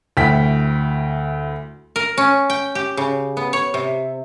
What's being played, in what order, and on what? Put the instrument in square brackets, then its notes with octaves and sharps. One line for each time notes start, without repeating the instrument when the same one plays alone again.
[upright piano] D2 E4 G5 B6
[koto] A#4
C#4
G5
G4
C#3
B3
C#5
C3